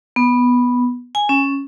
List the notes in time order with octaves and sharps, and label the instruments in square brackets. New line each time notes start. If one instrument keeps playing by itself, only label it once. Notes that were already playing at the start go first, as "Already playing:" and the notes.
[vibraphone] B3
G#5
C#4